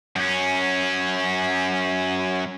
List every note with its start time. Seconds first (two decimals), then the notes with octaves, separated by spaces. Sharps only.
0.16 F#2 C#4